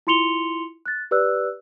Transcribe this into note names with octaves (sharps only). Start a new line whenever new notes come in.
E4 F4 C6 C#7 F7 G7
F#6 A6
G4 B4 D5 E6 F#6